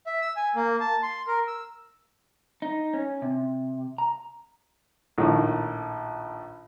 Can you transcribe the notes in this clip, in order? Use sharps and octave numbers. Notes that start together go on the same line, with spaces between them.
E5
E6
G#5
A#3
A5
C6
A#4
E6
D#4
C#4
C3
A#5
A#1 A2 D#3